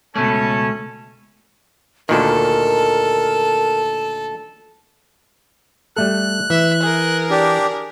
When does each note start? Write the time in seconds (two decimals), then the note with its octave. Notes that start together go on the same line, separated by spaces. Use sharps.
0.16 C#2 B2 A3 C#4 A4 A5
2.09 D2 A#2 D#3 A4 A#4
5.96 G3 A3 A4 F#6
6.50 E3 E5
6.82 G#4 A#4
7.30 D4 G4